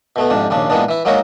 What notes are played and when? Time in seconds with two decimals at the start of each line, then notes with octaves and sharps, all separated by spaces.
0.16 B2 A3 B3
0.30 F2 G#2 C3 D4
0.50 A#1 D#2 C#3 D4
0.70 A#2 E3 G#3 B3 D4
0.89 E3 E4
1.05 F#3 G#3 A#3 D#4 F#4 C#5